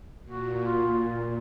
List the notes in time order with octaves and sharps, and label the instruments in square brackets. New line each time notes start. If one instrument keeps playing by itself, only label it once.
[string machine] A#2 [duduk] F#4
[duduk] F4